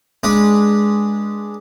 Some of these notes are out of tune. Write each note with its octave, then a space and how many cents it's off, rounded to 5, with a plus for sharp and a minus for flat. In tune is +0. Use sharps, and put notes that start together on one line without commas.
G#3 +0 D4 +0 B4 -25